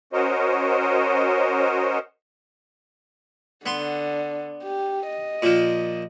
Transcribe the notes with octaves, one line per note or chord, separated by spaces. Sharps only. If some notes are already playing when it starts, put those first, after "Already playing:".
C#4 F#4 A#4 C5 C#5 D#5
D3 B3 C6
G4
D#5
A#2 F3